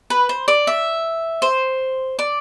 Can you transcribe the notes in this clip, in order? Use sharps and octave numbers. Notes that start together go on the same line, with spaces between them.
B4
C5
D5
E5
C5
D5